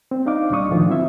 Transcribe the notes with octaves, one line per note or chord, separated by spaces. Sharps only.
C4
D4 D#4 D#5 F5 D6
D2 A#2 G3 D4 C#6 D#6
A2 D3 D#3 F3 F4
F#3 C4 E4 E5